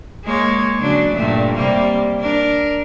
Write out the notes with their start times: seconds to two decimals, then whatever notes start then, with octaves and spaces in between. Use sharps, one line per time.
0.25 G#3 A#3 C#5
0.81 C#3 F#3 D4
1.15 G2 A#2 A3
1.55 C3 G3 A#3
2.20 D4 A#4